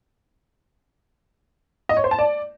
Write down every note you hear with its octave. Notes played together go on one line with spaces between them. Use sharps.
D#5
C#5
C5
A5
D5